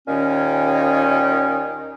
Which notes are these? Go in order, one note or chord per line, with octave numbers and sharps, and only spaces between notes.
D#2 A#2 D#3 C#4